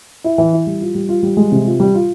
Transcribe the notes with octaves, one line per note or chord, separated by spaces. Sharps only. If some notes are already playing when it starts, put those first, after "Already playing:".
E4
E3
E4
G3
F4
G3
F4
G3
G#3
C3
F4
G3
F4